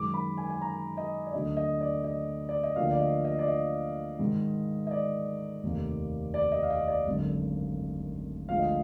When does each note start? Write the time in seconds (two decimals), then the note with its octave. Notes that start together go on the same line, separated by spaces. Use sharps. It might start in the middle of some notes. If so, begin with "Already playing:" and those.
Already playing: F#2 D#3 G#3 D6
0.14 B5
0.37 G#5
0.50 G#5
0.61 A#5
0.97 D#5
1.27 D5
1.33 D2 D3 F#3 D4 D#5
1.57 D#5
1.81 D5
2.04 D#5
2.49 D5
2.63 D#5
2.76 D2 D3 F3 A#3 D4 F5
2.91 D5
3.00 D#5
3.25 D#5
3.39 D5
3.48 D#5
4.19 G#2 D#3 G#3
4.87 D#5
4.91 D5
5.63 F1 D#2 D#3 A#3
6.34 D5
6.52 D#5
6.63 F5
6.70 D#5
6.88 D5
7.06 G#1 F#2 D3
8.49 D2 D3 F3 G#3 F5
8.59 D#5